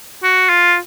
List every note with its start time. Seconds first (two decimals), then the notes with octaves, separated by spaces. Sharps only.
0.23 F#4
0.49 F4